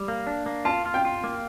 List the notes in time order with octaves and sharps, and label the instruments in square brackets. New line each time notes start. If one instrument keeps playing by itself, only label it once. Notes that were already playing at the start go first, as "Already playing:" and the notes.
Already playing: [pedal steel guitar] G3
A#3
D4
A#3
[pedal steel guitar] F4 [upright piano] A5
[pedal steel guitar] F4
[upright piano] G5
[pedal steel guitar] F4
A#3